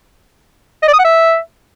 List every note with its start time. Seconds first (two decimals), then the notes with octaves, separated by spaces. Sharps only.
0.82 D#5
0.88 D5
0.93 D#6
0.99 F#5
1.04 E5